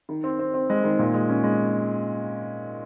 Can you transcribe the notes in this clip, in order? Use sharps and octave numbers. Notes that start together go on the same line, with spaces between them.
D#3
C4
C4
C4
G#3
D#3
A#2
G#3
C#4
G#3